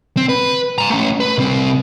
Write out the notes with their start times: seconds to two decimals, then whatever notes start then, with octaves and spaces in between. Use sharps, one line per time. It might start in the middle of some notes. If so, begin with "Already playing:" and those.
0.17 C4
0.29 B4
0.78 G#5 A#5
0.90 A3 C#4
1.20 B4
1.38 C2 C4